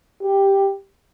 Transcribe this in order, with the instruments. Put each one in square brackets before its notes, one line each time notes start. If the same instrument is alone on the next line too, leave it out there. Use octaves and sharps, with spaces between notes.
[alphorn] G4